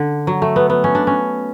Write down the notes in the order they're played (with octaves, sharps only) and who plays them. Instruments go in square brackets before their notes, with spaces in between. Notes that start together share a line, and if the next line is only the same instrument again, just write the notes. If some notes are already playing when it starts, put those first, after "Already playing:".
Already playing: [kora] D3
F#3
A3
B3
B3
C#4
D4
C#4